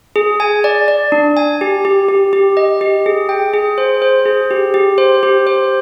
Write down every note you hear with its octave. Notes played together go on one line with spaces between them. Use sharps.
G#4
G#5
D5
D5
D4
G#5
G4
G4
G4
G4
D#5
G4
G#4
G5
G#4
C5
C5
G#4
G4
G4
C5
G4
C5